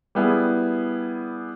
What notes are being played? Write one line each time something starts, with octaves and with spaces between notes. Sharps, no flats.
G3 B3 E4 G#4